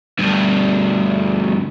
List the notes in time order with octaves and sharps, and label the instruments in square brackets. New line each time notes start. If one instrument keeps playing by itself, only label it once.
[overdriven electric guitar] D2 G2